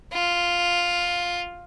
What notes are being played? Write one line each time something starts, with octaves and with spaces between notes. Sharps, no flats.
F4